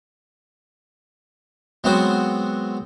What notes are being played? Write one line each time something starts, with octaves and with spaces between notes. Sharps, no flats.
F#3 G#3 B3 C4 F#4 C5